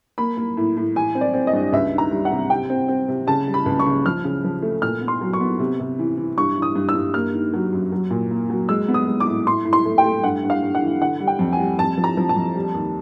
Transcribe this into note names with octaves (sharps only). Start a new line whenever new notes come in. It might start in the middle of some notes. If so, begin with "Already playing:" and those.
A#3 B5
A#3
A2
A2
E3 G#5
C4
D5
C4
D#5
G2
C#2 E5
D#3
A#5
G3
F#5
C3
C3 G5
C4
C4
C3
C#3 A5
G3
B5
C#2
C#6
C#3
F3 F6
C#3
F3
A3
A#2 F6
B3
C6
F#3
C#6
B3
C3
C3
E3
E3
G2 C#6
E3
D#6
G2
E6
G2
A#3 F6
D#3
F#3
F#2
F#3
A#2
A#3
F#3
G#3 E6
B3
D#6
G#3
D6
A2
A2 C6
A2
C6
A3
G5
A3
G2 F#5
G2
F5
G2
F#5
E3
D3 F#5
G3
G5
F2
G#5
G3
F2 A5
F3
A#5
F3
A5
F2
G3
D#2